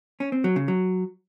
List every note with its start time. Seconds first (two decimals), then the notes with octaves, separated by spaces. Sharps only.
0.20 C#4
0.32 C4
0.44 F#3
0.56 C#3
0.68 F#3